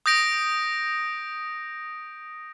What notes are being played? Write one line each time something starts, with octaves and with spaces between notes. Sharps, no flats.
D#6 G6 A#6 D7